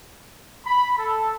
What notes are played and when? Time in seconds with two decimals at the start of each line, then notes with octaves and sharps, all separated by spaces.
0.65 B5
0.97 A4